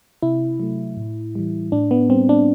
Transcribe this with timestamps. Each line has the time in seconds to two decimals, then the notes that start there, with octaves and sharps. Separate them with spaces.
0.22 C3 E4
0.60 F#3 A3
0.97 A2
1.35 E3 G3
1.72 A2 D4
1.91 B3
2.10 G3 C4
2.29 D4